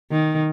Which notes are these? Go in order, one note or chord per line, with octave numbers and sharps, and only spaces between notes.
D#3